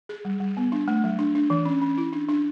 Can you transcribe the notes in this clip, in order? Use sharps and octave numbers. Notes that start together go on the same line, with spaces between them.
G#4
G3
G3
B3
D4
A3
F#3
D4
D4
E3
C#4
C#4
E4
D4
D4